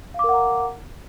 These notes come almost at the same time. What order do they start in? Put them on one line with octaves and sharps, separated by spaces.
F5 D6 A#4 F#5 A#5